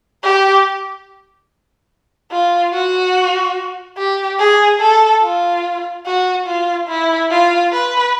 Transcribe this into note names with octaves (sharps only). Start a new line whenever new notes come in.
G4
F4
F#4
G4
G#4
A4
F4
F#4
F4
E4
F4
B4